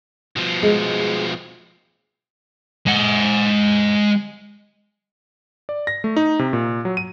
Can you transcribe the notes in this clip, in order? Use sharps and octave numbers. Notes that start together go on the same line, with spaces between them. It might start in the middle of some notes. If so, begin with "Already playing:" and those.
B2 F3
G#3
G#3 F#5
D5
A#6
A3
D#4
C3
A#2
F#3
D#7